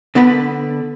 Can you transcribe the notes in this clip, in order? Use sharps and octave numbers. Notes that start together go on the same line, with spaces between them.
D3 B3 D4 B4 B5